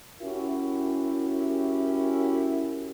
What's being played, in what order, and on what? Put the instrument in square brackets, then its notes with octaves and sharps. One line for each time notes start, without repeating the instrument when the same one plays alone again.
[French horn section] C#4 E4 F#4 G4 A#4